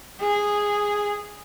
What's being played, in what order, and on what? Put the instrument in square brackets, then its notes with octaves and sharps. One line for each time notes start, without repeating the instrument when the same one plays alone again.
[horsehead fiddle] G#4